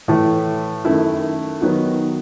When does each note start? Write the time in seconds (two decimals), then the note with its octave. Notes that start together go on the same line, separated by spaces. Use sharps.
0.08 A2 E3 A3
0.85 F#2 D#3 A3 E4
1.61 D#3 F#3 B3 D#4 F#4